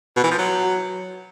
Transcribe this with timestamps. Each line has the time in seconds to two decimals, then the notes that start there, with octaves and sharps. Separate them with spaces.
0.16 B2
0.24 E3
0.31 F3
0.38 F#3